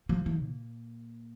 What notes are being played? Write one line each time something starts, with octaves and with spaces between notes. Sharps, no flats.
F3
E3
A#2